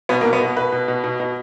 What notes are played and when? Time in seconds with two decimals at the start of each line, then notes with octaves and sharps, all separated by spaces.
0.09 B2 B3
0.21 A#3
0.25 B2
0.33 B3
0.41 B2
0.57 B2 B4
0.72 B2
0.88 B2
1.04 B2
1.20 B2